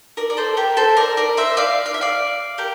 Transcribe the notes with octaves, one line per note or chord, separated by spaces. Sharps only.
A#4 D5
D5
A4 C5
G4 A#4
A4 C5
A#4 D5
A#4 D5
C5 E5
D5 F5
F5
E5
D5 F5
G4 A#4